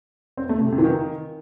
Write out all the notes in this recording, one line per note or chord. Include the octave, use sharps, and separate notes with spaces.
C4
A3
C3
C3
E3
D#3